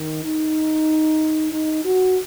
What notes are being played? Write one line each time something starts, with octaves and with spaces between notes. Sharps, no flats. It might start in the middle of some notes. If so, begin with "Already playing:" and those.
Already playing: D#3
D#4
D#4
F#4